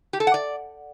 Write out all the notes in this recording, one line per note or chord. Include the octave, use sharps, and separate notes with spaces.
G4
A4
F#5
D5